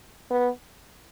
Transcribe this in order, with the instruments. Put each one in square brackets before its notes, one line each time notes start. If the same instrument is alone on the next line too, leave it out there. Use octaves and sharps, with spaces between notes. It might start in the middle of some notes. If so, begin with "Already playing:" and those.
[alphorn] B3